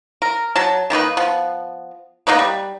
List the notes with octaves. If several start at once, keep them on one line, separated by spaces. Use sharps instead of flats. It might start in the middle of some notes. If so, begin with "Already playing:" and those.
A#4
F#3 A5
D#3 A#3 D#4 B4
F3 B3
A#3 B3 D#4 B4
G3